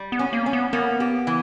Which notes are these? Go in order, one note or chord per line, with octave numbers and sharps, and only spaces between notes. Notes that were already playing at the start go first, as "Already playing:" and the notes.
Already playing: G3
B3
C#4
A#3
C#4
B3
A#3 B3
G4
E3